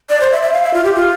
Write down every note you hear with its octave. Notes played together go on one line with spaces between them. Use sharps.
D5
C5
E5
E5
F5
E5
F4
G4
F4